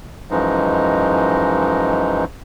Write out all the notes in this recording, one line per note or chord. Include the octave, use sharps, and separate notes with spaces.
F#2 E3 F3 G#3 D#4